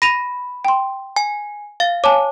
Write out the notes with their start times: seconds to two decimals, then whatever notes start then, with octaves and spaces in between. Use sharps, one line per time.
0.02 B5 A#6 D#7 F7
0.65 G5 C6
1.16 G#5
1.80 F5 A6
2.04 C#5 G#5 A5 D6